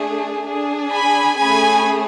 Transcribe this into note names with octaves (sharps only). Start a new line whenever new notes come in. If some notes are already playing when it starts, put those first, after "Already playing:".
Already playing: A3 D4 G#4
D4 G#4
G#5 B5
A3 C#4 G#4 G#5 B5